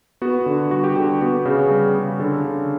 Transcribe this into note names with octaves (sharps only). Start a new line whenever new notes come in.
B3 F#4
D3
G3 F#4
G4
D3 G4
B3 F#4
C#3
G3
C#3
D3 A4
D3